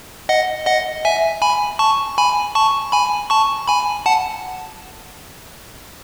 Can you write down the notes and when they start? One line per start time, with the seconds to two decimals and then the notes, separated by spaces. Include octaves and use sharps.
0.29 D#5 F#5
0.66 D#5 F#5
1.05 E5 G#5
1.42 G#5 B5
1.79 A5 C#6
2.18 G#5 B5
2.55 A5 C#6
2.92 G#5 B5
3.30 A5 C#6
3.68 G#5 B5
4.06 F#5 A5